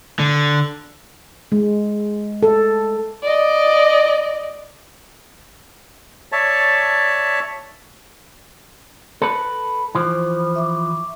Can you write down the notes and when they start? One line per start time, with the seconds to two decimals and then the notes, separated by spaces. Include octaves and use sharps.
0.19 D3
1.52 G#3
2.43 A4
3.23 D5 D#5
6.32 C#5 D5 E5 A5
9.22 A4 B4
9.95 E3 F3 C5
10.56 E5 C#6 D6